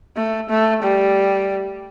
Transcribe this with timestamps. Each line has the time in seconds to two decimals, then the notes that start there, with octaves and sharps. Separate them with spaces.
0.16 A3
0.50 A3
0.83 G3